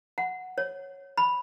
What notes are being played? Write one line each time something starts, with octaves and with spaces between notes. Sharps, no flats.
F#5
C#5
B5